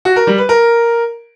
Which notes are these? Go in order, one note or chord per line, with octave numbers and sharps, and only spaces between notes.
F#4
A#4
G3
B4
A#4